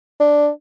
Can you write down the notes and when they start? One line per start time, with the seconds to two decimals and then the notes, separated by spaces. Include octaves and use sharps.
0.20 D4